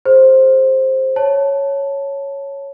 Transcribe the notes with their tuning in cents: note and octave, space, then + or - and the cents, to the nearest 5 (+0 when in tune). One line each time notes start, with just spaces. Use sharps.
G#4 +0 C5 +10
C#5 +0 A5 +0